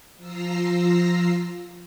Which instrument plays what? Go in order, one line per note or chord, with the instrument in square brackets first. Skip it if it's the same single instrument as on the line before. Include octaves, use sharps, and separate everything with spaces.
[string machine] F3 F4 A#5 E6 A#6 C7